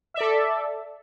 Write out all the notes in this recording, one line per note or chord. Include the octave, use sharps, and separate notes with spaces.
A4 D5 E5